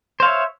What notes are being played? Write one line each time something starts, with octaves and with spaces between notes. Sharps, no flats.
C5 C#5 E5 F5